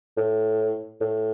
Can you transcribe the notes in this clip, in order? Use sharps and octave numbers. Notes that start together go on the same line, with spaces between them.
A2
A2